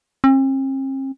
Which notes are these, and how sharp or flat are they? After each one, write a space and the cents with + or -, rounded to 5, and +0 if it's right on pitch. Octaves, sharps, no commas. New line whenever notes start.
C4 +45